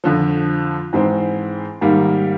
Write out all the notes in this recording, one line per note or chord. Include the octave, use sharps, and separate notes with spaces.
F2 D3 F3
G#2 E3 G#3 C4
G#2 D#3 G3 A#3